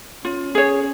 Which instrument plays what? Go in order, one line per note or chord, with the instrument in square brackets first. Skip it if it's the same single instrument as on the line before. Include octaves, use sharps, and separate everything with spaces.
[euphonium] C#4 [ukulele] F4
[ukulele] G#4 C#5